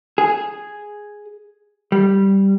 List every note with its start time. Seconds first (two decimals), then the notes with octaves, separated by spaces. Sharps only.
0.18 G#4
1.92 G3